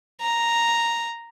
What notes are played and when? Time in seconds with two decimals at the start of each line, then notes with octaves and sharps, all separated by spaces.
0.21 A#5